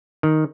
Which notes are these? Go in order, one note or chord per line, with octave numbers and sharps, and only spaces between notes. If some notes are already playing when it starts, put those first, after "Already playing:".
D#3